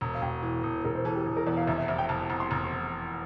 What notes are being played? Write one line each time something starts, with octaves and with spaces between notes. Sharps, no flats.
E1 A#5
F5
E1 G5
E3
E1
E1 A#4
C5
E3 A4
G4
E1
A#4
E2 D5
F5
F1 E5
E5
F1 E5
G5
F1 A5
A5
F1 A#5
C6
F1 A#5
C6